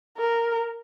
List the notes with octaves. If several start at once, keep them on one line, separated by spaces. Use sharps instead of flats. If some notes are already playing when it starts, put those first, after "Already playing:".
A#4